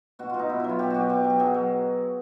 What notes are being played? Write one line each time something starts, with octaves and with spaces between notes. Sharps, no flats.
B2 F#4
B2 F4
D#4
B2 E4
F#3 E4
F4
B2 G4
B2 F#4 G4
B2 G4
F#3 G4
G4
F#3 G#4
F#3